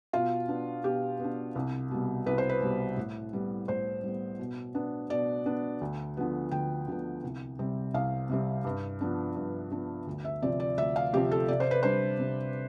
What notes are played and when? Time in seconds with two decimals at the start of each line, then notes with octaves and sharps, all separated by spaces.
0.13 B2 F4
0.48 B3 D4
0.84 B2 G4
1.20 B3 D4
1.55 C2
1.91 B2 G3
2.26 C2 B4
2.38 C5
2.49 B4
2.61 B2 G3
2.97 A2
3.33 G3 B3
3.68 A2 C5
4.03 G3 B3
4.39 B2
4.75 B3 D4
5.10 B2 D5
5.46 B3 D4
5.81 D2
6.17 D3 F3 B3
6.52 D2 G5
6.88 D3 F3 B3
7.23 C2
7.59 C3 G3 C4
7.94 C2 F5
8.29 C3 G3 C4
8.64 G2
9.01 F3 B3 D4
9.36 G2
9.71 F3 B3 D4
10.07 D2
10.25 E5
10.42 C3 F3 C4 D5
10.60 D5
10.78 D2 E5
10.96 F5
11.13 C3 F3 C4 G4
11.31 A4
11.48 C3 D5
11.60 C5
11.71 B4
11.83 G3 D4 C5
12.19 C3